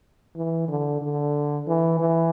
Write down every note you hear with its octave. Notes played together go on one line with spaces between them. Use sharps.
E3
D3
D3
E3
E3